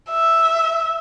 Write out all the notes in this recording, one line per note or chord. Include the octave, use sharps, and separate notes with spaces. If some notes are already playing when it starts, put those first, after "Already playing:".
E5